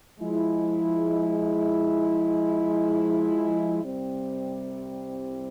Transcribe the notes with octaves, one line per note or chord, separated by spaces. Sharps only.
F3 G#3 E4
C2 C3 G3 C4